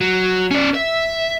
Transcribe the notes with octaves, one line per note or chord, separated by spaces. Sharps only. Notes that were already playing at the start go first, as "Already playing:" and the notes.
F#3
C#4 D5
E5